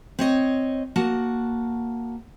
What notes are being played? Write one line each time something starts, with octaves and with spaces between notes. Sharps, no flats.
C4 C#5 D#5
A#3 F#4 F#5 A5